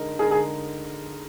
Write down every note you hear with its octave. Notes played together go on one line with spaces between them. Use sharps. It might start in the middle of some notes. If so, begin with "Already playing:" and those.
Already playing: D3 G#3 D#4 A#4
D3 G#3 D#4 G#4 A#4
G#4